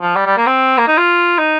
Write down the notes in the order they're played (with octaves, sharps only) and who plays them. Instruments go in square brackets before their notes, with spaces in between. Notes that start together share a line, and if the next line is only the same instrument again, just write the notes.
[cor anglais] F3
G3
G3
A#3
C4
A#3
D#4
F4
D#4